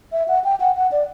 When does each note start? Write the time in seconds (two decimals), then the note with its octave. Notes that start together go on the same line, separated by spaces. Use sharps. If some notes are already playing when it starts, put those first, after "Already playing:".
0.12 E5
0.28 F#5
0.44 G5
0.60 F#5
0.76 F#5
0.92 D5